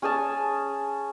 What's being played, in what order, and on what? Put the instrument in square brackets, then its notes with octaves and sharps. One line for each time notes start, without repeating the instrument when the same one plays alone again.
[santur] C#4 G#4 G#5 A5